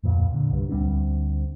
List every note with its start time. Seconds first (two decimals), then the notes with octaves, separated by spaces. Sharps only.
0.03 D1 F2 A#2
0.32 A#2 D3
0.50 C2 G2
0.69 D2 G3 C4 D4